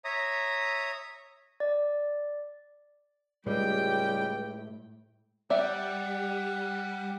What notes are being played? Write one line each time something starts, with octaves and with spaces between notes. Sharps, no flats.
C#5 E5 A#5 D#6
D5
C#2 A2 G3 G#3 G4 G5
G3 G4 D5 E5 F#5